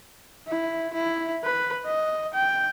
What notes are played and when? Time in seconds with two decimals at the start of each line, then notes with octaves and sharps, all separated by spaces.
0.48 E4
0.93 E4
1.44 B4
1.86 D#5
2.34 G5